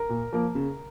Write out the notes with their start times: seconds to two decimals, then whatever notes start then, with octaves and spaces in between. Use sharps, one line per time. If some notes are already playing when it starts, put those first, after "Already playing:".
Already playing: A#4
0.09 A#2
0.32 F3 A#3
0.55 C#3